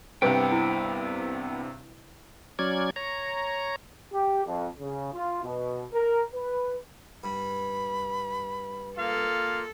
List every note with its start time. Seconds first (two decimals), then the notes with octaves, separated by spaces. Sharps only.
0.22 C2 G2 C3 B3 B4 C5 G5
0.52 E4
2.59 F#3 C#4 D5 G#6
2.96 C#5 A#5
4.13 G4
4.45 F2
4.80 C#3
5.13 F4
5.43 B2
5.93 A#4
6.34 B4
7.24 G2 B5
8.98 A#3 F4 A4 F5